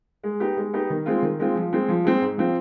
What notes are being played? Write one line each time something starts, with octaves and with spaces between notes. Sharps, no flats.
G#3
B3 D#4 G4
G#3
B3 D#4 G4
D#3
G#3 C4 F4
D#3
G#3 C4 F4
F3
G#3 C4
F3
G#3 C4
G#2
F3 C4 F4